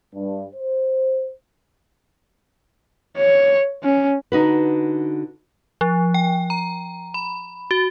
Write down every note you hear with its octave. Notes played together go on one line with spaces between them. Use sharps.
G2
C5
C#5
C#4
D3 D#4 F#4 B4
F3
G5
A#5
B5
F#4